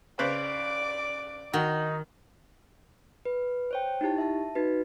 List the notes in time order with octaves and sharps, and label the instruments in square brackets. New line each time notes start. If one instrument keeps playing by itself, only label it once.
[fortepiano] C#3 B4 C5 [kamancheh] D5 D6
[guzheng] D#3 [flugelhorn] D#4 [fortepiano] F#4
[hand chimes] B4
C5 C#5 G5
D#4 E4 G4 A5
E5 A5
D#4 F#4 B4